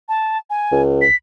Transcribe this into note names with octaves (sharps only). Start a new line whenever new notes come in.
A5
G#5
C#2
B6